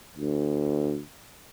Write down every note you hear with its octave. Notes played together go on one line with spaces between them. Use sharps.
D2